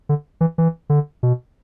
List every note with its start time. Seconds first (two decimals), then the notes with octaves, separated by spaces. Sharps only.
0.09 D3
0.41 E3
0.58 E3
0.90 D3
1.23 B2